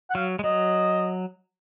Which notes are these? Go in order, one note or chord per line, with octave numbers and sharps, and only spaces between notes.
F#5
F#3 F5
G#3
F#3 D#5